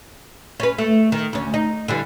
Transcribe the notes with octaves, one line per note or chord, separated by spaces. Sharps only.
C#4 B4
A3
D#3
D2 C#4
D#4
D3 E3 G3